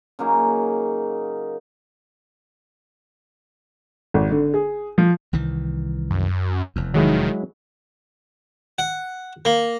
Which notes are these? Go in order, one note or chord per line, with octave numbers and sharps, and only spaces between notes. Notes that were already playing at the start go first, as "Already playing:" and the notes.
C#3 F#3 A#3 D#4
G#1
D3
G#4
F3
C2 D#3 E3
F#2
F1 E2
D#3 F#3 G#3 E4
F#5
A#3